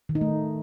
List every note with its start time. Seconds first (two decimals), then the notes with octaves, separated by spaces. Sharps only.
0.09 D#3
0.15 D#4
0.21 A3